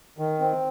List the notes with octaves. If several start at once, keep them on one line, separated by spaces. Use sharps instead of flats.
D#3
C4